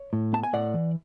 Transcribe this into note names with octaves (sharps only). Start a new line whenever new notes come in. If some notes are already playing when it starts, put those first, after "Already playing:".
Already playing: C#5
A2
B3 A5
G#5
A2 D5 F#5
E3